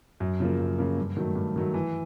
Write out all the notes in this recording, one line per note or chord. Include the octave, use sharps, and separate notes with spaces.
F#2
C#3 F3 A#3
F#2
C#3 F3 A#3
G2
D#3 F#3 A3
G2
D#3 F#3 A3
E3